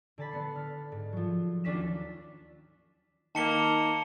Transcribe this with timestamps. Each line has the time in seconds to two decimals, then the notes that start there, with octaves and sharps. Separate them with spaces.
0.18 D3 A5 B5
0.31 D3 B3 C7
0.56 F6
0.92 G#2
1.12 F3 F#3
1.64 D#2 C#4 D4 F4 B6 E7
3.35 D#3 A#3 A5 C#7 G7